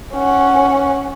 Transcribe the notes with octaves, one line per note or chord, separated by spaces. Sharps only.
C#4 F#5